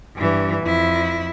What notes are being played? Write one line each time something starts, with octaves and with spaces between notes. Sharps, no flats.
G2 E3
F2 E4